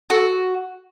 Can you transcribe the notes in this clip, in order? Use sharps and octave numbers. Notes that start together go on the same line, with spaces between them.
F#4 A4